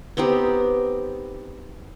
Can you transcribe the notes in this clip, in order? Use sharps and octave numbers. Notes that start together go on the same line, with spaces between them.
B3 C4 D#4 G4